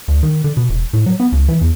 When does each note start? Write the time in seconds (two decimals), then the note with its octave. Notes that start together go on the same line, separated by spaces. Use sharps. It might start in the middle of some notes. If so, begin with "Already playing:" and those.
0.08 D2
0.23 D#3
0.44 D3
0.57 B2
0.69 E1
0.93 A2
1.06 F#3
1.20 B3
1.32 C#2
1.48 E3
1.61 E2